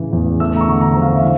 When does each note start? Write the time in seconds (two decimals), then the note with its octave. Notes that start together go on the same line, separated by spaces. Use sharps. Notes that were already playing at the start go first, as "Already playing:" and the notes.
Already playing: A2 C#3 E3
0.13 E2
0.40 A3 E6
0.56 A#5
0.61 C#6
0.68 D3
0.81 A#5
0.95 F3
1.02 F5
1.16 E5
1.22 E3 F5